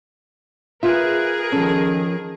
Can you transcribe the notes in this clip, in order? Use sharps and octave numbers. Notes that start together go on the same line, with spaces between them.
F4 G#4 A#4 B4 E5
D#3 F3 C#4 A4